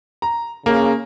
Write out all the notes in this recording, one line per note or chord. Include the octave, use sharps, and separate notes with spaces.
A#5
C#3 A#3